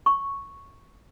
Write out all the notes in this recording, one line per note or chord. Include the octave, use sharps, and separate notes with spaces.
C#6